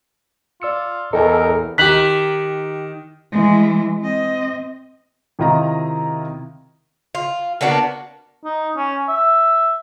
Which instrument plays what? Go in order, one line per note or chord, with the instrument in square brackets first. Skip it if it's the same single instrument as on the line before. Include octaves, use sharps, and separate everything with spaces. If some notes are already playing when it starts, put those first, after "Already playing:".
[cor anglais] F4 [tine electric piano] D5 E6 C#7
[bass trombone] E2 [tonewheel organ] A4 [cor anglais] A#4 [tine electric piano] D#5 G5 G#5
[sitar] D#3 [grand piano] G4 F#6 [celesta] B6 F#7
[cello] E3 G#3
C4 D#5
[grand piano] C3 D#3 E4 F4 D#5 A#5
[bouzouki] F4
A#3 B3 D4 F#4
[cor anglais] D#4
C#4
E5